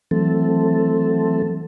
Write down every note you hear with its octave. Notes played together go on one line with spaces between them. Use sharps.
E3 F#3 A3 C4 A4